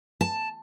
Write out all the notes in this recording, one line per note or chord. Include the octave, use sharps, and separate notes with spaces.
A5